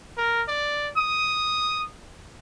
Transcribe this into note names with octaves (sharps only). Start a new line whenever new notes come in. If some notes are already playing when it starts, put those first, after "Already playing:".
A#4
D5
D#6